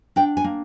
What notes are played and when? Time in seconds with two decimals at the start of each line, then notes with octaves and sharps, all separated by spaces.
0.16 D4 G5
0.37 G#5
0.44 A#3